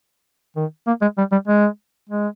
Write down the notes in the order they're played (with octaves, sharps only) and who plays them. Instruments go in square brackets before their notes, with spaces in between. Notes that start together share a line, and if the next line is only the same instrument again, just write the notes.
[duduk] D#3
A#3
G#3
G3
G3
G#3
G#3